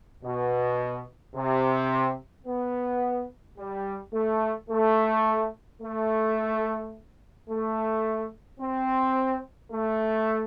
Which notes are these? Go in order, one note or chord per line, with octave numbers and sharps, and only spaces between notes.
B2
C3
B3
G3
A3
A3
A3
A3
C4
A3